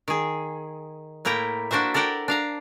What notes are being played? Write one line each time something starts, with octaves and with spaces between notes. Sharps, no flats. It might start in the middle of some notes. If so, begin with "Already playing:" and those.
D#3 G#4
A2 A#3 E4 G5 A#5
A#3 D4 F#4 C5 E5
A4 A#4 D5 F#5 G5
D4 F5 A#5